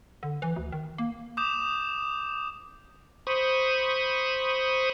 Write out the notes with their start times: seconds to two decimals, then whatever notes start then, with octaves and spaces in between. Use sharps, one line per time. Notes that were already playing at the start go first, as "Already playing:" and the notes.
0.23 D3
0.42 E3
0.56 D2
0.72 D#3
0.98 A#3
1.37 D6 D#6 G6 E7
3.27 C5 B5 C#6 D#6